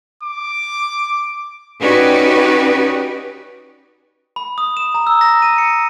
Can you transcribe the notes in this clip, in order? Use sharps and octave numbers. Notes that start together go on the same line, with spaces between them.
D6
C#4 D#4 F#4 G4 B4 D5
B5
D#6
E7
A#5
E6
A#6
D#7
C#7